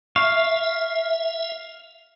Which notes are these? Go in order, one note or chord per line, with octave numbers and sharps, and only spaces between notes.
E5 F5 C#6